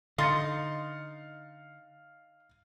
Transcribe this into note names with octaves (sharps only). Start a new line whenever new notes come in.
D3 D#4 F5 C6 D#6 A6 C#7